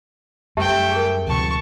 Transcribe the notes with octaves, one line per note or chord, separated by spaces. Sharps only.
F#2 G3 A3 G4 E5 G5 A5
G#4 A#4
D2 C3 F3 A5 C#6